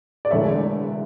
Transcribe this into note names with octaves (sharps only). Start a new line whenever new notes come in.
D5
E1 E2 D3 A3 C#5 E5